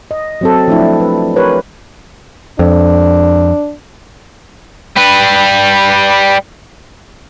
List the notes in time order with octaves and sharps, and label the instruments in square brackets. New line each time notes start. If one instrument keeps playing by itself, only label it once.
[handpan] D#5
F#3 C4 A4
F3 A3 D4 E4
B4
G4 A#4 B4 C#5
[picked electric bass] F2 [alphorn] D4
[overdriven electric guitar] G3 B4